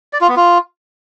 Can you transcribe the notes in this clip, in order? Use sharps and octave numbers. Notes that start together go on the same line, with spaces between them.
D5
F4
B3
F4